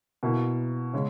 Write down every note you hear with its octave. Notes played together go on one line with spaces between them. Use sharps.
B2 A#3 E4
C#3 G#3